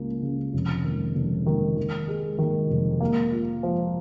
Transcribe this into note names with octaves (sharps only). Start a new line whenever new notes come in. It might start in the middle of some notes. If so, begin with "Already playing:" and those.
Already playing: C#2 C#3 A#3
C#3
F1
D#3
F1
D#3
D#3
G#3
D#3
F1
A#3
F4
F3